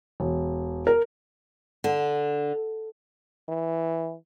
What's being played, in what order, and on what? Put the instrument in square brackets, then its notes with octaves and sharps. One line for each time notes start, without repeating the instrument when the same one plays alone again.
[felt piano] E1
A#4
[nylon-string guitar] D3
[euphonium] E3